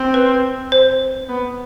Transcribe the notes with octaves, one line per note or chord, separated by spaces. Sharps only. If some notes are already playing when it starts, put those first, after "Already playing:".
Already playing: C4
B4
C5
B3